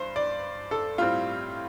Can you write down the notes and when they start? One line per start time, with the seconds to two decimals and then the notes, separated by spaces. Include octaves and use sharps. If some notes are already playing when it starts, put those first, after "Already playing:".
Already playing: G2 C5
0.16 D5
0.71 A4
0.98 A2 G3 C4 F4